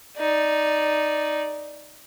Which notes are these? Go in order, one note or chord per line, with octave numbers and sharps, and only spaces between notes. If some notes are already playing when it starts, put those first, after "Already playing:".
D#4 D5